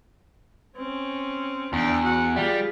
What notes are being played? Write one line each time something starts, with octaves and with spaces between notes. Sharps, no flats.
C4 C#4
E2 D4 G5
F#4 F#5
G3 F4 G#4